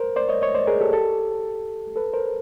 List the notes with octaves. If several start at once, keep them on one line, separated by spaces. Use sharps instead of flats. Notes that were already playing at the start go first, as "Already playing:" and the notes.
Already playing: A#4 C5
C5 D5
C#5 D#5
C#5 D#5
C5 D5
G#4 A#4
G4 A4
G4 A4
A4 B4
A#4 C5